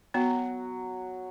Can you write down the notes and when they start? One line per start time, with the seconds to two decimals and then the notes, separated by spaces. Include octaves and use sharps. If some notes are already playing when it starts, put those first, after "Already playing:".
0.14 F#3 B3